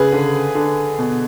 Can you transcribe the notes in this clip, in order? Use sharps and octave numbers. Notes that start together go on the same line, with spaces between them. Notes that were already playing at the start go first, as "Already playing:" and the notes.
Already playing: C#3 G#4 B4
D3
D3
B2